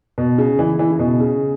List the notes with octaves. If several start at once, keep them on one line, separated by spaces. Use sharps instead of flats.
B2
C#3
E3
E3
C#3
B2
C#3